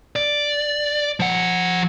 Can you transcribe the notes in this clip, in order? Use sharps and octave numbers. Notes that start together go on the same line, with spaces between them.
D5
F3 F#5